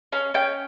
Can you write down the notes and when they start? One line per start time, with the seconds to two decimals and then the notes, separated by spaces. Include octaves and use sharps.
0.12 C#4 F5
0.34 C#4 G5